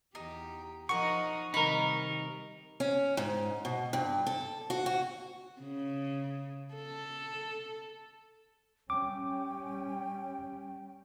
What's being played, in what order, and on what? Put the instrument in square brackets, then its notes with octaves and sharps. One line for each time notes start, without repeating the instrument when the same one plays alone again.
[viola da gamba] E2 G4 [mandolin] D#4
[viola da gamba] F3 D#4 D#5 [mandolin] A#4 F#5 [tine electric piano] C#6
[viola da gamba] C3 D#3 G3 [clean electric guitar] D#4 A#4 [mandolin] B5
[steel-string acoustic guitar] C#4
G#2
B2
G2
A4
F#4
F#4
[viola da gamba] C#3
A4
[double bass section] G3 C#4 [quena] G5 [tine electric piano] D6